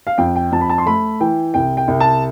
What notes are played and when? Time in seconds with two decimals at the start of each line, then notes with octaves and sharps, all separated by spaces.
0.07 F5
0.18 F2 G5
0.36 G5
0.52 F2 A5
0.61 B5
0.70 A5
0.78 C6
0.86 A3 B5
1.20 E3 G5
1.54 C2 G5
1.77 G5
1.88 C2
2.00 A5